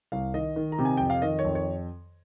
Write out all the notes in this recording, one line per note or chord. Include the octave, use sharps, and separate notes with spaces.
C2 F5
D#3 D#5
D#3
A#5
C3
G#5
F2 G5
F5
D#3 D#5
C#5
F2
C#5